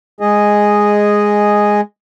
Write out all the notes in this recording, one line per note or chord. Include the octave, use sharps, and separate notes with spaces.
G#3 G#4 D#5